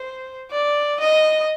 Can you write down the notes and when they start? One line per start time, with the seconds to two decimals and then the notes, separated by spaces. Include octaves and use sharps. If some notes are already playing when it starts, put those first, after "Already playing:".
Already playing: C5
0.52 D5
1.00 D#5